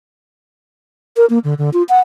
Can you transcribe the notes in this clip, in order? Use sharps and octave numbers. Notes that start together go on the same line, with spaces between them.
A#4
A#3
D3
D3
F4
F#5